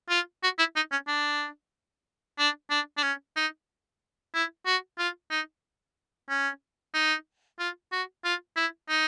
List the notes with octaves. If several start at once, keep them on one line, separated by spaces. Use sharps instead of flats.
F4
F#4
E4
D#4
C#4
D4
D4
D4
D4
C#4
D#4
E4
F#4
F4
D#4
C#4
D#4
F4
F#4
F4
E4
D#4